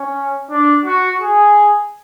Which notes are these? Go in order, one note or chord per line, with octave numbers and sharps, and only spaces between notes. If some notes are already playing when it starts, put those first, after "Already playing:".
Already playing: C#4
D4
F#4
G#4